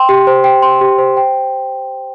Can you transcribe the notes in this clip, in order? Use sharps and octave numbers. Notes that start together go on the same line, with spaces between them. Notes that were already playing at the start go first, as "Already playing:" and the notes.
Already playing: G5 C6
G4
C5
G5
C6
G4
C5
G5